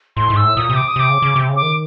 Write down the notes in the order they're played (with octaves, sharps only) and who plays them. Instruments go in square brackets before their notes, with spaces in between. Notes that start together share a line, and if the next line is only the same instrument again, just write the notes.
[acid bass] A2 [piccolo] C6
[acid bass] G#2
[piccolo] E6
[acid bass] A2
[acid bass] A#2 [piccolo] D#6
[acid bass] C3
[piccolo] D6
D#6
[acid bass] C3 [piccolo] D6
[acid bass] C#3
C#3
C3
C#3
[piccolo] D6
[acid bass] D#3